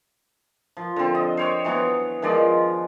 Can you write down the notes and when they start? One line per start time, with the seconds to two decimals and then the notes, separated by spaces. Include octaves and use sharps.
0.77 F3
0.96 D3 C4
1.15 D#5
1.37 C5 C#5 G5
1.65 E3 F#3 B3 C#5
2.22 D#3 F3 G#3 D5